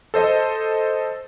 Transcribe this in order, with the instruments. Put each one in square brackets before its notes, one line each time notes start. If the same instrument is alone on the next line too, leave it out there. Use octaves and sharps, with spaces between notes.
[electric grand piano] A4 C5 D#5